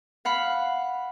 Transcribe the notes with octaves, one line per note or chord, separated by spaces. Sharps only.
F5 F#5 B5